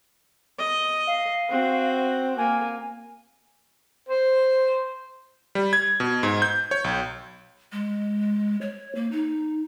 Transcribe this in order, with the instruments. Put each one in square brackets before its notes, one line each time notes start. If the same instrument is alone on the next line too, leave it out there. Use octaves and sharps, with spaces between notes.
[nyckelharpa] D#5
[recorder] F5
[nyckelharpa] C4 F#4
[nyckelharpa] A#3 [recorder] G#5
[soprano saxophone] C5
[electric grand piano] G3
G#6
B2
G#2
G6
C#5
B1
[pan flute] G#3
C#5
A#3
D#4